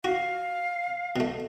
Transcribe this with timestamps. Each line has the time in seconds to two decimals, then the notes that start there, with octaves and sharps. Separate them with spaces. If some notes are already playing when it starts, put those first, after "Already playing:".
0.05 F#4 F5
1.16 B2 A3